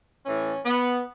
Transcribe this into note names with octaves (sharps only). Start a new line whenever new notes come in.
A2 E3 C#4
B3